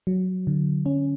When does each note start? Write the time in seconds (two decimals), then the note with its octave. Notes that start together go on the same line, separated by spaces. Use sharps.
0.07 F#3
0.47 D3
0.86 C#4